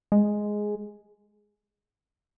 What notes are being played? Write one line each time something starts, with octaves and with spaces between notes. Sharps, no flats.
G#3